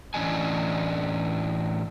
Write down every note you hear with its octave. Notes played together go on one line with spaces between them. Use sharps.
A2 E3 C#4 D4 D#5 G#5